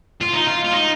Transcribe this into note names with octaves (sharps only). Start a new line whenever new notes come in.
F4
D#4
F4
F4
D#4